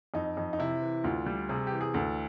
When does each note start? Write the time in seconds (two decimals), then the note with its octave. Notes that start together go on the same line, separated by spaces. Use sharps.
0.14 F2 D#4
0.37 F2
0.53 D#4
0.59 C3 E4
0.82 E3
1.04 D2 F4
1.26 G3
1.49 C3 G#4
1.67 G4
1.72 E3
1.81 G#4
1.94 D2 A4